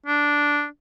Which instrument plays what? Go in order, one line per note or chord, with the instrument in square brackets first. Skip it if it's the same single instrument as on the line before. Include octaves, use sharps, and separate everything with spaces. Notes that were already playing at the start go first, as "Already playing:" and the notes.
[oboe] D4